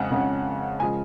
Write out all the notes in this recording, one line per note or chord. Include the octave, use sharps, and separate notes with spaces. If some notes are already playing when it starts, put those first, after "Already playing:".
Already playing: F2 C#3 G#3 C#4 F#5
F2 C#3 G#3 C#4
C#3 F3 G#3 G#5